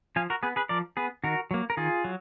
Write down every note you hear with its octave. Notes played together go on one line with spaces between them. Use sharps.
F3 F5 G#5
F#4 A#4
B3 G#4 B4
G#4 B4
F3 A#4 D5
B3 G#4 B4
D#3 F#4 A#4
F#3 A#3
A#4
D#3 F4 G#4
F#3